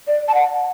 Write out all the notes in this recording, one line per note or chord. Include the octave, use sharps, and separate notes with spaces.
D5
A5
F#5